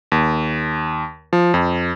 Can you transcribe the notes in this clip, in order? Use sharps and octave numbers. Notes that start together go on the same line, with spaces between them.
D#2
F3
F2